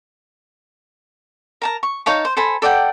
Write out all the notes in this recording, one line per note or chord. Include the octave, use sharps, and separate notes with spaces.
A#4 A5 A#5
C#6
D#4 C#5 F5 A5
C5
A4 C5 G#5 B5
A4 D5 F#5 G5